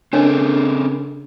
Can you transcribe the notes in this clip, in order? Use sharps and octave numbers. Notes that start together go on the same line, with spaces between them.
C#3 C4 D4 A4 A#4 C#5 D#5